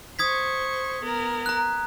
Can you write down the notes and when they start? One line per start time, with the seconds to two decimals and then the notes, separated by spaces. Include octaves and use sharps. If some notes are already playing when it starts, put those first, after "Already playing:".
0.19 C5 C#6 D#6 G#6 B6
1.03 B3 A#4
1.46 A#5 F#6